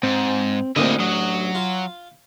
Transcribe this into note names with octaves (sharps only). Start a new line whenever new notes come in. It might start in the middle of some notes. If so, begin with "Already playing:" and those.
G#2 C4
A1 D2 D3 A#3 C4 E4 D#5
F#3 D#6
F4